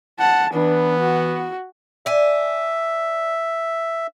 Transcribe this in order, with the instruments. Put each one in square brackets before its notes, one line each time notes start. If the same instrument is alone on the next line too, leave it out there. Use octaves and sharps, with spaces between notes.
[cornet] F#5 [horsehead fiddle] A5
[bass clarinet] E3 [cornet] B3 [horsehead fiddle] D4
[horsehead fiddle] F#4
[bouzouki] D4 G#5 [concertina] E5